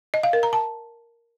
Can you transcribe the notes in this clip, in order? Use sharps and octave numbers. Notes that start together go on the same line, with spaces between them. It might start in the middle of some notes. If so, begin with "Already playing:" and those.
D#5
F5
A#4
A#5
A5